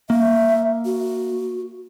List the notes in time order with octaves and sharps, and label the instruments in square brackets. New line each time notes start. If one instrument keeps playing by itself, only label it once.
[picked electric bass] A#3 [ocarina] E5
[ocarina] F#4